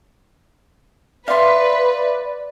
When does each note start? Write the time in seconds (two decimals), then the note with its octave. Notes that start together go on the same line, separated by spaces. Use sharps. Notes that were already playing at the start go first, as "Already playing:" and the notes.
1.28 B4 D5 E5 F5 C6